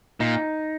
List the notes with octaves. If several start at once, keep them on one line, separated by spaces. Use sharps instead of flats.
A#2 D#4